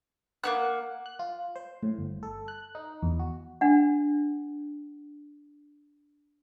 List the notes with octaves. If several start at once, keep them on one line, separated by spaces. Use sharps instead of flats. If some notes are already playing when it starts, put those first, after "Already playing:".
A#3 B3 F#5 F#6
F#6
F4
C5
A2
G1
A4
F#6
D#4
E2
F#4
D4 F#5